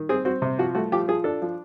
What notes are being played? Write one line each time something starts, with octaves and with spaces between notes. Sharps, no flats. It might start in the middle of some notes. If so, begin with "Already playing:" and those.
Already playing: D#3
C4 G#4
C4 F#4
C3
F3 F#4
A3 F#4
F3 G4
F3 G#4
D4 A4
F3